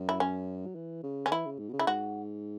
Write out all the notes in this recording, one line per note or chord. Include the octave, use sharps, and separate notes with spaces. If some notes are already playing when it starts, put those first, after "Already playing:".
Already playing: F#2
E4
C#4
F#3
E3
C#3
C#3 C#4
E3 E4
C#3
G#2
B2
C#3
E4
G#2 F#4